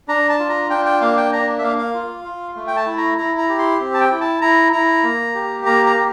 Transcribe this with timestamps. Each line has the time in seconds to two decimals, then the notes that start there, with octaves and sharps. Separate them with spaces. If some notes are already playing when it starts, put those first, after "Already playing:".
0.08 D4 A#5
0.29 A5
0.39 F4
0.49 A#5
0.70 D4 G5
0.85 G5
1.01 A#3 F5
1.17 G5
1.32 D4 A#5
1.58 E5
1.63 A#3 F5
1.78 F5
1.94 F4
2.24 F4
2.56 A3
2.67 G5
2.76 A5
2.87 E4
2.97 A#5
3.18 E4 A#5
3.38 A#5
3.49 G4
3.59 C6
3.80 C4
3.94 A5
4.01 G5
4.11 E4
4.21 A5
4.41 E4 A#5
4.72 E4 A#5
5.04 A#3
5.35 G4
5.66 A#3 A#5
5.86 A#5
5.96 G4